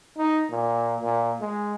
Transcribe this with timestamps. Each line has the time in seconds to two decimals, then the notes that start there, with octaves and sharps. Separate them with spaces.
0.17 D#4
0.50 A#2
1.00 A#2
1.40 G#3